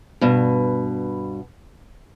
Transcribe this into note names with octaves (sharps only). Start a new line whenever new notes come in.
G2 B2